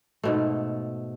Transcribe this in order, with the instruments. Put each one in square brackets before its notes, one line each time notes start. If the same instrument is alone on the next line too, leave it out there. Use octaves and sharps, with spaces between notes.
[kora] G#2 B2 A3